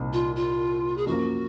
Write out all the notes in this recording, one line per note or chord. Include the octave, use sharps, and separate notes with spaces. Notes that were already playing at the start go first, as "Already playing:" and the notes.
Already playing: C2 A#2 C4 D#4
F4
F4
G#4
F#2 F3 A#3 F#4